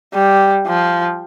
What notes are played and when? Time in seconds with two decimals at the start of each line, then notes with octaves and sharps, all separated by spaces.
0.14 G3
0.67 F3